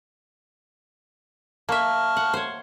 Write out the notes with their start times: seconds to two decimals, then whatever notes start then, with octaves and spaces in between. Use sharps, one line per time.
1.69 A#3 E5 A5 C#6 F6
2.17 F#5
2.34 C5 C#5